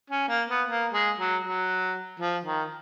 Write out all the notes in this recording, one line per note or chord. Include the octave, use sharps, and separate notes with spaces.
C#4
A#3
B3
A#3
G#3
F#3
F#3
F3
D#3